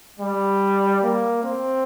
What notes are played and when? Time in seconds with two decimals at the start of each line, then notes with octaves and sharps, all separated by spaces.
0.20 G3
1.02 A#3
1.43 C4